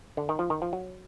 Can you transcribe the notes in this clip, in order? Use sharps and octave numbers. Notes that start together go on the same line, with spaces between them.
D3
D#3
F3
D#3
F3
F#3